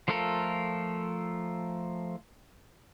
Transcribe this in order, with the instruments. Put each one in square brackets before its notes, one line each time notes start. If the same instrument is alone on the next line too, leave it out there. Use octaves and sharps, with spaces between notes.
[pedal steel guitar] F3 A3 F4 A4 A#4